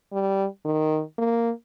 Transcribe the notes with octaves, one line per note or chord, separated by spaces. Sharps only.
G3
D#3
A#3